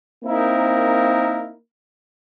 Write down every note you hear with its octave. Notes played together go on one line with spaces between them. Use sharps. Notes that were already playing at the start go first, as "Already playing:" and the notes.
A#3 C4 D#4 E4 A#4